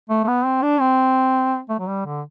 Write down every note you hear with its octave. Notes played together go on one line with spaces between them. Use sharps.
A3
A3
B3
C4
D4
C4
A3
F#3
G3
D3